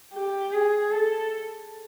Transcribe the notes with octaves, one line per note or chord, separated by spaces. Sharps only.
G4
G#4
A4